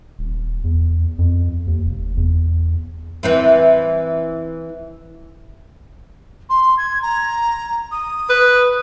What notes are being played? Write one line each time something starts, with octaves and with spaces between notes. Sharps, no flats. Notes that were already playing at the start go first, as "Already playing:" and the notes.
D#1
E2
F2
D#2
F1
E2
E3 C4 E4
C6
G#6
A#5
D#6
B4